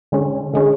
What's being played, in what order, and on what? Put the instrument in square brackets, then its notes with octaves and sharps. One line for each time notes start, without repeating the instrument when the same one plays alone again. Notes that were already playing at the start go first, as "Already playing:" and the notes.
[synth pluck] D3 G#3 C#4
D3 G#3 C#4